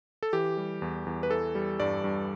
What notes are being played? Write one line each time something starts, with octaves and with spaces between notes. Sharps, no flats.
A4
E3 G4
G3
E2
E2
B4
E3 A4
G3
G2 D5
G2